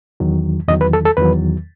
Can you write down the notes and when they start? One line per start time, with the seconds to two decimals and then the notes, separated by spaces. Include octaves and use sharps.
0.20 E2 D#3 F#3
0.68 E2 D#3 F#3 D#5
0.81 B4
0.93 A4
1.05 A4
1.17 E2 D#3 F#3 B4